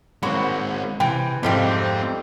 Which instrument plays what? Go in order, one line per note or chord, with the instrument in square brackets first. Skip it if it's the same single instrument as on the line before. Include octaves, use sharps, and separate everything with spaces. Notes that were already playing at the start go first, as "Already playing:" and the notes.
[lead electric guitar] G#3 C4 [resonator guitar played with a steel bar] A#3 F#4 C#5 [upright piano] B5
[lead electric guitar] C3 [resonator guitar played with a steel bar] E3 [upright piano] G5
[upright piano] F2 G#2 F4 [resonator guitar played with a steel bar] G3 A3 G4 [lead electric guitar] C4 C5